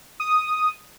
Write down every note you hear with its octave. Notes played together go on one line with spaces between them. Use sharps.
D#6